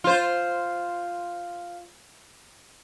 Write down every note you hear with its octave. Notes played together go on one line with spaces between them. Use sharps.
F4 C5